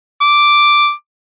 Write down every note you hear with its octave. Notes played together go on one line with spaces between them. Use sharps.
D6